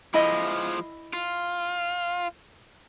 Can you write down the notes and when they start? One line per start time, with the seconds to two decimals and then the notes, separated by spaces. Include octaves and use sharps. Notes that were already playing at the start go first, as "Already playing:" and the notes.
0.14 F3 G#3 E4 D#5
1.13 F4